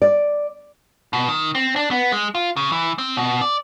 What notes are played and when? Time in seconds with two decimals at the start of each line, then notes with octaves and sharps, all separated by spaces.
0.02 D5
1.13 B2
1.29 D#3
1.55 C4
1.76 D4
1.91 B3
2.12 G#3
2.35 F4
2.57 C#3
2.72 E3
2.98 C4
3.17 B2
3.41 D5